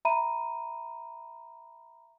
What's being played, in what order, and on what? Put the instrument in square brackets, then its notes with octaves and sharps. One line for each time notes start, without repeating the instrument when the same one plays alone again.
[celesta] E5 A#5 B5 D#7